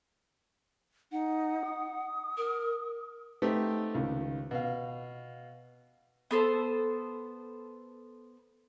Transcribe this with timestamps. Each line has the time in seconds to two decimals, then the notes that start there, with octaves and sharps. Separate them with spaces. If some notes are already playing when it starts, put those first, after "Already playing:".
1.12 D#4 F#5
1.65 D#6
2.37 A#4
3.42 A3 B3 C4 D#4 G4
3.95 C#2 D#3
4.51 B2 F5
6.31 B3 A4 C5